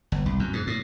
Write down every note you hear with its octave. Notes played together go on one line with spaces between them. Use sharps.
G1
C2
F#2
G#2
A2